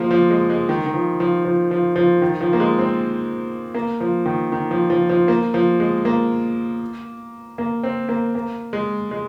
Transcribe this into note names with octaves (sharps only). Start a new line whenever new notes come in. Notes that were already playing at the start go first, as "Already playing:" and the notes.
Already playing: F3 G#3 A#3
F3
G#3
G#3
D#3
D#3
F3
F3
F3
F3
F3
D#3
F3
A#3
G#3
C4
A#3
F3
D#3
D#3
F3
F3
F3
A#3
F3
G#3
A#3
A#3
C4
A#3
A#3
G#3
G#3